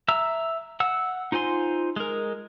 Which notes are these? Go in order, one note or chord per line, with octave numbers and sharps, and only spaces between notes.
E5 A#5 E6
F#5 E6
D#4 F4 C5 G#5 C6
G#3 A#4